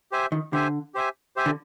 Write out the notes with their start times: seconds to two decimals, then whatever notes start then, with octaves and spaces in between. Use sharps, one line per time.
0.12 G4 C5 E5 G#5
0.32 D#3
0.52 D3 G4 C5 E5 G#5
0.94 G4 C5 E5 G#5
1.36 G4 C5 E5 G#5
1.46 D3